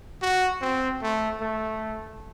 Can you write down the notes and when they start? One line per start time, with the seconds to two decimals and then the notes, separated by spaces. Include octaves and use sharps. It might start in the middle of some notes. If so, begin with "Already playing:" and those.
0.22 F#4
0.61 C4
1.02 A3
1.41 A3